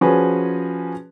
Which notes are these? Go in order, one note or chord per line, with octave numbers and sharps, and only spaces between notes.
F3 C#4 F#4 G#4 B4